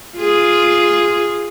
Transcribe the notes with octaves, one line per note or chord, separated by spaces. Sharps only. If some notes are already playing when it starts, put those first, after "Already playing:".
F4 G#4